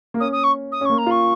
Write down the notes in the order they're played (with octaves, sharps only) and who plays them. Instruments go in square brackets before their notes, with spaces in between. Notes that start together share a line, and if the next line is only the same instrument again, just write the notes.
[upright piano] A#3
[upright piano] C#4 [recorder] D#6
[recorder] D#6
C#6
D#6
[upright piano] C#4
[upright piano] A#3 [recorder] C#6
[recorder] A#5
[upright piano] F4 [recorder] C#6